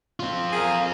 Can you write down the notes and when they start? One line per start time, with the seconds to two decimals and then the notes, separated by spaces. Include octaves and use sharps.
0.20 C4 F4
0.52 G#4 A#4 F5